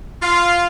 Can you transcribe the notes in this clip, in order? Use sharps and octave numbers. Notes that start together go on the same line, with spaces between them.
F4